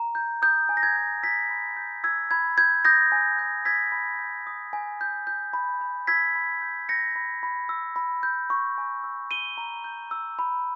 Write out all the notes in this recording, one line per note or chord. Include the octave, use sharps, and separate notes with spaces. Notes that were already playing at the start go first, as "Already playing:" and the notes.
Already playing: A#5
G6
D#6 G6
G#5
A#6
G#6
G6
E6 G#6 B6
B5
G6
E6 G#6
B5 G#6
G6 G#6
D#6 G6 A#6
G#5
G6
E6 G#6 B6
B5
G6
D#6
G#5
G6
G6
B5
B5
E6 G#6 B6
B5
G6
G6 A#6 C#7
B5
B5
E6
B5
G6
C#6
G#5
E6
C#6 D#7 G7
A#5
G6
E6
B5